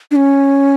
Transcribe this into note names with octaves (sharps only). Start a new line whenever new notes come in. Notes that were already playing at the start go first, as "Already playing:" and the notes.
D4
C#4